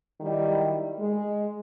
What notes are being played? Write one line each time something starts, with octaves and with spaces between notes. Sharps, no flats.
D#3 F#3 G3 D#4 E4
G#3